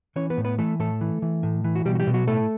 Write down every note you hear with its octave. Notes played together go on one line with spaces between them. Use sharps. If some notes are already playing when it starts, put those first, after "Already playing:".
E3 C#4 C#5
B3 B4
A2
B3 B4
E3 A3 A4
A2 A3 A4
E3
E3
A2
E3
F#4
B2 G3 G4
F#4
G3 G4
B2
F#3 F#4
A2 A3 A4